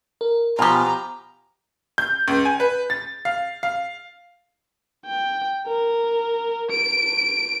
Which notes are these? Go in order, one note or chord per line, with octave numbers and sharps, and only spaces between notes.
A#4
B2 F3 F4 G4 G#5 A#5 B5
G6
C#2
G#5
B4
A6
F5
F5
G5
A#4
D7